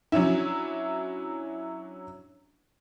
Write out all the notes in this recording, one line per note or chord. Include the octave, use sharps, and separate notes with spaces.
F#3 C#4 D4 E4